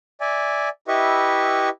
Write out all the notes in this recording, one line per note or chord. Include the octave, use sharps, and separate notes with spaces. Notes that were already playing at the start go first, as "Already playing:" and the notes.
D5 E5 G#5
E4 G4 B4 D#5 E5 C#6